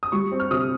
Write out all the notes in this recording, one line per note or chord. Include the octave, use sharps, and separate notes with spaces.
D#6
G3 C#6
C4
F6
C3 D#6